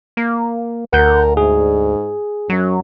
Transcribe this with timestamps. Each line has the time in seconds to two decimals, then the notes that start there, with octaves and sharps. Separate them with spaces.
0.17 A#3
0.93 D2 A#4 F#5 G6
1.37 G#2 G#4
2.50 F#2 F#3